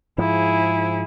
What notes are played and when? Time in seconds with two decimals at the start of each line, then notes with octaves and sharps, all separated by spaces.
0.18 G#2 F3 E4 G#4